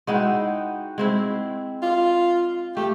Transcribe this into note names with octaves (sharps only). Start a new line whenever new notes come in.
G#3 D#4 E4 F#4 F#5 G5
G#3 C4 E4
F4 D5 F5
A3 G4